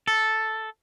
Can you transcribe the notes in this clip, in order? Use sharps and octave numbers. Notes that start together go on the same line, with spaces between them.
A4